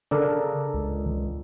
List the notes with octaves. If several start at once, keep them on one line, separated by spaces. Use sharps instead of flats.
C#3 D4 A4 A#4
C#2